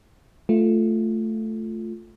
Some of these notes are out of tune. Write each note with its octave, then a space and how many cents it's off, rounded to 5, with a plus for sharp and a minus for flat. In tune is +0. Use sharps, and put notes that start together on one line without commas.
A3 +0 F4 +0